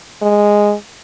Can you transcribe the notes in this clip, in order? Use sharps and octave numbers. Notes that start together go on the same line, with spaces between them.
G#3